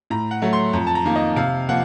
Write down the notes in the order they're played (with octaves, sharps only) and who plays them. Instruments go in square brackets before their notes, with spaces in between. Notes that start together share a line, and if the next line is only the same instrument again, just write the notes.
[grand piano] A2 A#5
F#5
F#3 A3
C6
F2 A#5
A5
A#5
D#3 A#3
D#5
C3 F5
F3 A#3 F#5